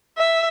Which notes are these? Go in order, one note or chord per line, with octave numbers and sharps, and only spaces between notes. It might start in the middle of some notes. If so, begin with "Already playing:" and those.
E5